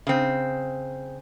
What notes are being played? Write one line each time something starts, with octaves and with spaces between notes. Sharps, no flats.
C#3 C4